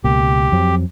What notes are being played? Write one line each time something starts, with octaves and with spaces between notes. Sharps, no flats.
C#2 B2 A#3 G4
F2 F#3 C4